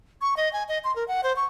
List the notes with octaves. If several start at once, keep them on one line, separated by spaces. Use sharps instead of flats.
C#6
D#5
G#5
D#5
C6
A#4
F#5
C5
C#6